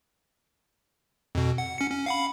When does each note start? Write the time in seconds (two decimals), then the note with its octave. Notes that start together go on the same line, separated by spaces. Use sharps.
1.35 F2 B2
1.58 F#5
1.78 C#4 C#7
1.91 C#4
2.06 F5 F#5 B5